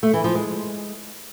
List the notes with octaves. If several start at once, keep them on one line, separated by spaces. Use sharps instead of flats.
A3
E3
F3
G#3